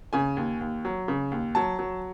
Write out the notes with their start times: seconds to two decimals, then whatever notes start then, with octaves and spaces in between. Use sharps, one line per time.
0.13 C#3 G#5
0.37 D#2
0.61 D#2
0.85 F#3
1.08 C#3
1.32 D#2
1.55 F#3 A5
1.79 F#3